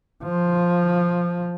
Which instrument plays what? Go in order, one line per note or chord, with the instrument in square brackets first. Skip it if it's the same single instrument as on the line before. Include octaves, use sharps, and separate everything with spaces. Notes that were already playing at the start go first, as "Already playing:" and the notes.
[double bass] F3